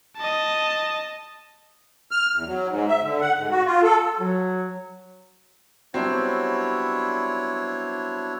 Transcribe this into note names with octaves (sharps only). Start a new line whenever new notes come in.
D#5 A5
F6
E2
F#3
G#2
E5
D3
F#5
G#2
F#4
F4
A4
F#3
F#3 G3 B3 C4 D4 E4 C#5